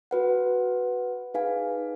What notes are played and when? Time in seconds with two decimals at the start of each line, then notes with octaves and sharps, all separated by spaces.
0.11 F#4 B4 F#5
1.34 D#4 G#4 B4 F5 G#5